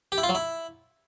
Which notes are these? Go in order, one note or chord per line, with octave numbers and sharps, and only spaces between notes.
G4
E4
F4
F#3
E4